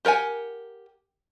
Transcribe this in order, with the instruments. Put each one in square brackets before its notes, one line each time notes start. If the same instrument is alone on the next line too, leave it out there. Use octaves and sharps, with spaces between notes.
[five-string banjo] G4 A#4 F#5 G#5